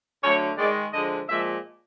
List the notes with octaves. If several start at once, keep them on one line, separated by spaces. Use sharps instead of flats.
D3 F#3 A3 C#5
D#3 G#3 D5
D3 F3 G#3 D#5
A#2 F3 G#3 E5